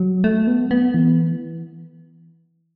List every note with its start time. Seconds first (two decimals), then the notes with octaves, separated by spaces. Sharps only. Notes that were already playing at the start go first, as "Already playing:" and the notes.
Already playing: F#3
0.24 A3
0.47 B3
0.71 B3
0.94 E3